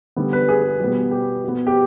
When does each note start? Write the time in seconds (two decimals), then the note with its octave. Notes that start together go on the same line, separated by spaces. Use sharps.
0.16 D3 G3 B3
0.33 B4
0.48 G#4
0.79 B2 G3 B3
1.11 G4
1.43 B2 B3
1.67 G4